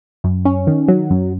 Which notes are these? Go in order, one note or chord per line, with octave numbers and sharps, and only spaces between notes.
F#2
C#4
D#3
F#3
F#2